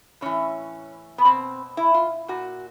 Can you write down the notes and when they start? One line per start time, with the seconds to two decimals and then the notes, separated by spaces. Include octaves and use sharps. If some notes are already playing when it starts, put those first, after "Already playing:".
0.21 A2 E3 C#4
1.18 B3
1.24 B2 C4
1.77 E4
1.94 F4
2.28 A#2 F#4